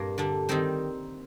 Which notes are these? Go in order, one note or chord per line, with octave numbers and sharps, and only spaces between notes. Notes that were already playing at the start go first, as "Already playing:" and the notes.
Already playing: G2 A#2 A#3 C4
D3 G3 D4
D#3 G3 C4 D#4 C5